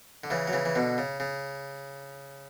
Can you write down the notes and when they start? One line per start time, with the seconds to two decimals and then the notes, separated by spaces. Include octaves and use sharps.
0.24 D3
0.30 C#3 E3
0.47 F#3
0.53 C#3 E3
0.65 E3
0.75 B2 D3
0.98 C#3
1.20 C#3